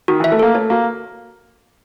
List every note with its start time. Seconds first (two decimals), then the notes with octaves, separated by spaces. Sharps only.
0.08 D#3 F#4
0.20 E3 E5
0.32 A3
0.39 A#3 A4
0.55 A3 C#5
0.70 A#3 F#4